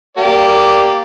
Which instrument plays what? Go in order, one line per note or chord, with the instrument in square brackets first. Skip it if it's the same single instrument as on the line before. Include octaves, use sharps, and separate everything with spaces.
[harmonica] A#3 G4 D5